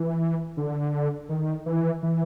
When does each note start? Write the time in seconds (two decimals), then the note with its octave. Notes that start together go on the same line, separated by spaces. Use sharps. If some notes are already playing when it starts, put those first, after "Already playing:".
Already playing: E3
0.57 D3
1.29 D#3
1.66 E3
2.03 E3